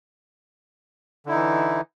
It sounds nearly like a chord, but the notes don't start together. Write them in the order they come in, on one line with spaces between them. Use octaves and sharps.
D3 E4 D#4 E3